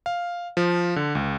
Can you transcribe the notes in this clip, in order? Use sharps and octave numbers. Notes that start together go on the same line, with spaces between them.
F5
F3
D3
C#2